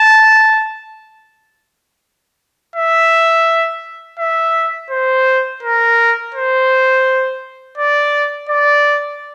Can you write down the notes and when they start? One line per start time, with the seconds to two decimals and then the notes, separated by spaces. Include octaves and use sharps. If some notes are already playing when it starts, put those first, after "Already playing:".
Already playing: A5
2.76 E5
4.19 E5
4.90 C5
5.63 A#4
6.34 C5
7.77 D5
8.49 D5